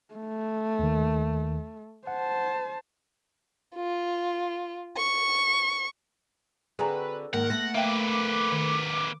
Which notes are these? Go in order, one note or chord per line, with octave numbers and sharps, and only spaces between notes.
A3
D#2 D#3
C5 F#5 A5
F4
C#6
D3 C4 F#4 G#4 B4 G#5 A#5
G#2 D#3 A#3 A#4 F#5
A3 B3 A#6
A#3 B4 E5 F5 G5 D6
D#3